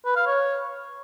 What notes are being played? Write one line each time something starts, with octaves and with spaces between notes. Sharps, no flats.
B4
F5
C#5